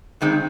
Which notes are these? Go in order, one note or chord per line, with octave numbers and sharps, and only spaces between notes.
G2 D#3 G#3 C4